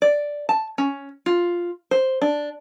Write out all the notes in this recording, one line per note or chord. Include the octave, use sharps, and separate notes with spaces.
D5
A5
C#4
F4
C5
D4